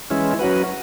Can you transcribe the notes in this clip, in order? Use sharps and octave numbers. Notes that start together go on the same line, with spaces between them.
E3 G#3 C#4 E4
F#3 C#4 F#4 B4